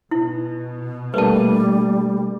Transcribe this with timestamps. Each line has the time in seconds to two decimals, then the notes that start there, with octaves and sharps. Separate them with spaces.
0.11 B2 E4
1.14 G3 A3 A#3 D4 B4 A5